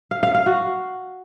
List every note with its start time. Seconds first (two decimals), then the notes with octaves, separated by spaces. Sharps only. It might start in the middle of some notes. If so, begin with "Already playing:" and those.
0.11 F5
0.23 F5
0.34 F5
0.46 F#4